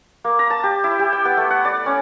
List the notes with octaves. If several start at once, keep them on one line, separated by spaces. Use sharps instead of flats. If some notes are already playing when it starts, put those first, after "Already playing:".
A#3
A#5
A5
G4
E4
G4
G5
B3
A3
F#5
D5
C#4